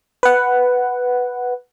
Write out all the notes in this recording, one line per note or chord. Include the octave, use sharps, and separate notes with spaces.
B4 F#5